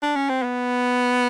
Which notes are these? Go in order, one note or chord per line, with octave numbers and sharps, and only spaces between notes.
D4
C#4
C4
B3